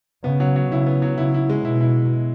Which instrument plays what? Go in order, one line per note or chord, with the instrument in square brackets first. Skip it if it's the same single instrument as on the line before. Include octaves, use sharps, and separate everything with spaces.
[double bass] C#3 [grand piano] B3
[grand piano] F#3
F#3
[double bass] C#3 [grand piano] E4
[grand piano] B3
F#3
[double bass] C#3 [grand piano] E4
[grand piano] E4
G#3
[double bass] B2 [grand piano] E4
[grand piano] E4